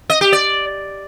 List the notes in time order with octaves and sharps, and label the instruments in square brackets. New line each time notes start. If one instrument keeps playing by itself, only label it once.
[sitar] D#5
G4
D5